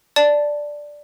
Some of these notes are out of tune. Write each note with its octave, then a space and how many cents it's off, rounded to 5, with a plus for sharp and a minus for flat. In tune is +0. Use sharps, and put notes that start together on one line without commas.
D5 +0 A5 +0